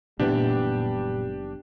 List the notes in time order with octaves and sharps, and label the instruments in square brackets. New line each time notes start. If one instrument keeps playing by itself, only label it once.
[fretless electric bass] F#1 E3 B3 [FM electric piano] A#2 [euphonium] G3 [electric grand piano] D4 G4